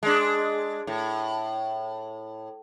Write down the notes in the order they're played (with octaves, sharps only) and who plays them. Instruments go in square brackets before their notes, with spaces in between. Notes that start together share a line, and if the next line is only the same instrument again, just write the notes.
[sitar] G#3 D4
A2